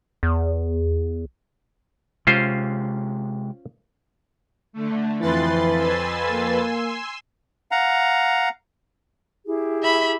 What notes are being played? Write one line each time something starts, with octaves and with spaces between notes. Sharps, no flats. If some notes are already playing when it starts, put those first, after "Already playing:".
E2
C3 G#3 C#4 F4 C5
D3 A3
F2 E3 B4 C6 A6
G#5 C6 E6
A#3
F5 F#5 A#5
E4 G4 G#4
E5 B5